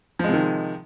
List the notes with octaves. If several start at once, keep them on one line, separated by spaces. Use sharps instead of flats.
C3 D#3 F3 G#3